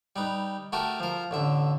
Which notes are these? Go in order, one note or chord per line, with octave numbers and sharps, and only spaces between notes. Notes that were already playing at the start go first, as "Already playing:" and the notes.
G3 D#4 B4
A3 F#4 G4 A4 A#4
F3 A#4
A1 D3 E5